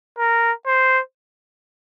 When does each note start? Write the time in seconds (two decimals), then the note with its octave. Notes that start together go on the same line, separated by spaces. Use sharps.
0.18 A#4
0.67 C5